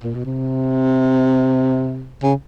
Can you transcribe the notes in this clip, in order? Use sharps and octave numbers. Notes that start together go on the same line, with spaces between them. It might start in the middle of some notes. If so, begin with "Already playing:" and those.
A#2
B2
C3
C#3